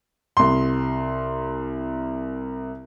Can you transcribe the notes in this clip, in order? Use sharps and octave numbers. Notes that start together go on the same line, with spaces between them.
C2 C6